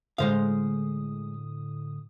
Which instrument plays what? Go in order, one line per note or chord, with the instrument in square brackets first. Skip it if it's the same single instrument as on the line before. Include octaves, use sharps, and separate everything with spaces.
[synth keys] A2 D3 D#6 [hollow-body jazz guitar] G#3 C5 F5